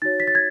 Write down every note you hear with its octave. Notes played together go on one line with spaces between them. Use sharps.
D#4 F#4 C#5 A6
B6
A6
G#6